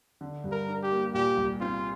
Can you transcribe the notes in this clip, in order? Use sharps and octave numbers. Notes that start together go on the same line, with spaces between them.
D3
G2
A#4
D4
G4
A#3
A#2 G4
C2
C4 F4